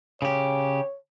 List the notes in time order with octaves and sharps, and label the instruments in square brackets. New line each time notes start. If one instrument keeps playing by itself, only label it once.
[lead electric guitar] C#3 G4 [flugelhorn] C#5